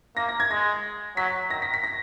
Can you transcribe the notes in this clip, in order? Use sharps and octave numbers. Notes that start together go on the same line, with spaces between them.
A#3 A#6
A#6
G#6
G#3 A#6
F#3 B6
D#3 A#6
B6
B6
A#6